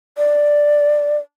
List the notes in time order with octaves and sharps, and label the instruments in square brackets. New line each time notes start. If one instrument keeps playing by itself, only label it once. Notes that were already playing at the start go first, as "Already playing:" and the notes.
[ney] D5